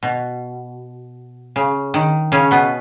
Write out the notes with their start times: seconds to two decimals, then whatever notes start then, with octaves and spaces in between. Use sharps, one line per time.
0.03 B2
1.56 C#3
1.94 D#3
2.32 C#3 C#4
2.51 B2 B3